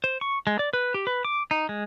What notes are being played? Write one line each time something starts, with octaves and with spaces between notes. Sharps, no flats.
C5
C#6
G#3
D5
B4
G4
B4
D6
D#4
G#3